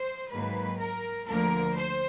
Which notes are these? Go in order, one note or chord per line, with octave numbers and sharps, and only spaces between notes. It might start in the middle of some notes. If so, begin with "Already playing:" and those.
Already playing: C5
G#2 D#3 F#3 A#3 B4
A#4
D2 D3 F3 A#3 A#4
C5